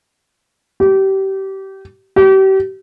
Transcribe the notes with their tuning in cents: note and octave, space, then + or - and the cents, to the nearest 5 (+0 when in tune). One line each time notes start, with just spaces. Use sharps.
G4 -25
G4 -35